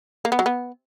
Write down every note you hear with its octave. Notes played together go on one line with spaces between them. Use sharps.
A#3
B3
F#3
B3